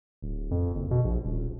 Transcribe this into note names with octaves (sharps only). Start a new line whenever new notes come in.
D1
F2
F#1
B2
A#1
D#1